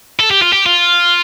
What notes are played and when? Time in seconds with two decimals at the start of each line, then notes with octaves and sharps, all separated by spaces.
0.20 A4
0.31 G4
0.42 F4
0.53 G4
0.66 F4